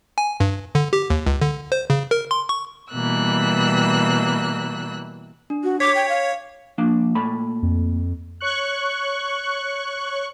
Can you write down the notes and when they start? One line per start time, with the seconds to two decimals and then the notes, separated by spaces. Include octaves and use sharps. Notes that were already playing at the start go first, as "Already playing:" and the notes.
0.18 G#5
0.40 G2
0.75 D3
0.93 G4
1.10 D#2
1.26 C#2
1.41 D3
1.72 C5
1.90 C#3
2.11 A#4
2.31 C6
2.49 C#6
2.93 B2 E3 G3 A#3 E6 F#6
5.50 D4
5.64 F#4
5.80 C#5 D6 B6
5.95 G5
6.09 F5
6.78 F3 A#3 D4
7.15 A#2 A3 B5
7.63 F2
8.41 C#5 C#6 F#6